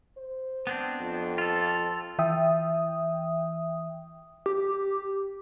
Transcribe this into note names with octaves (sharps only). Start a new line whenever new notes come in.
C5
B3 C4 D4
F2
F4 A4
E3 E5 G5 D#6
G4